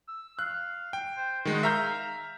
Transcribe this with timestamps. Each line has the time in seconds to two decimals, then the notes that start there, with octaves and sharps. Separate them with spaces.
0.08 E6
0.39 F5 F#6
0.93 G5
1.17 C5
1.45 D#3 G#3 F#4
1.63 E5 F5 A#5 G6